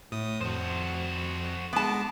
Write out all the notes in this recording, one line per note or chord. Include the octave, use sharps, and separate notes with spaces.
A2 D#6
F2 F#4 C5
G#3 B3 A5 D6